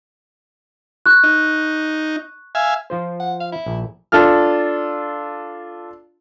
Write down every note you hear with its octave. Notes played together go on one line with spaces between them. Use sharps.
C#6 F#6
D#4
E5 F5 G#5
F3 F4 C5
F#5
F5
E4
A#1
D4 F4 A4 F6